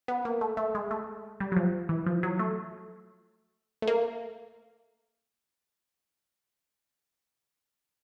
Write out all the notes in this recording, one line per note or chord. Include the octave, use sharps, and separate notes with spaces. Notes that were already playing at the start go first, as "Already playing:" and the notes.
B3
A#3
A3
A3
G#3
A3
G3
F#3
F3
E3
F3
F#3
A3
A3
A#3